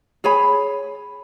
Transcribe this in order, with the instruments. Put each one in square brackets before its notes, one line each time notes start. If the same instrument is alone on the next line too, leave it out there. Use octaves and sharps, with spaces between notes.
[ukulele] G#4 C#5 G#5 B5